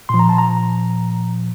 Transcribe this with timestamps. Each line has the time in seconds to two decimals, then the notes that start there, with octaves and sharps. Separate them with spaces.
0.09 A#2 F3 C6
0.19 A#5
0.29 A5
0.38 A#5